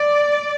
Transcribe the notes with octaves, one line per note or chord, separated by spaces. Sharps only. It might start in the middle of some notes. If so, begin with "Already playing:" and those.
Already playing: D5